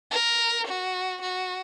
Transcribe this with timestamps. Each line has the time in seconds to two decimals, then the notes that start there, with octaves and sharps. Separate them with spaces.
0.11 A#4
0.67 F#4
1.22 F#4